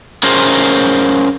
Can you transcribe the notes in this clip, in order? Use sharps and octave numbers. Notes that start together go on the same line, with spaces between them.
C#4 G#4 A#4 C5